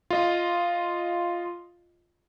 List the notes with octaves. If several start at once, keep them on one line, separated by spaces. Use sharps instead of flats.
F4 D#5